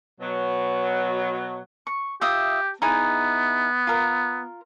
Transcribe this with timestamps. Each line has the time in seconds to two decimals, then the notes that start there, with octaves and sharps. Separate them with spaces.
0.21 B2 F#3
1.87 C#6
2.21 F4 G4 E5 D#6
2.82 B3 D#4 E4 G#4
3.87 F4 A#4